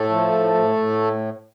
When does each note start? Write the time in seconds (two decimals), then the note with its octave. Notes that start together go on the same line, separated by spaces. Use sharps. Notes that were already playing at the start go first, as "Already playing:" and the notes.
Already playing: A2 A3 A4
0.09 F3
0.32 A2
0.54 A2
0.77 A2